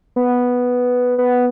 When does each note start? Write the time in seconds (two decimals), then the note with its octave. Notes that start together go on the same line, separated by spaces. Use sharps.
0.16 B3
1.18 B3